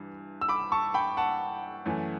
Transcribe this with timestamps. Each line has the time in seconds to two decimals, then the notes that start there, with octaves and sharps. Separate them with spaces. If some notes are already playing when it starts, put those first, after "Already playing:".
Already playing: G2 E3
0.41 E6
0.49 B5 D6
0.72 A5 C#6
0.94 G5 B5
1.17 F#5 A5
1.86 F#2 E3 A3